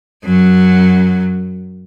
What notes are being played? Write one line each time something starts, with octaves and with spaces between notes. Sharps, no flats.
F#2 F#3